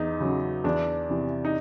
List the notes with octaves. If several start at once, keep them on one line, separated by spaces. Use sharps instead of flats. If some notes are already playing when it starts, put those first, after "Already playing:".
Already playing: E2 D#4
C#3 F#3
E2 D4
C3 E3
D#4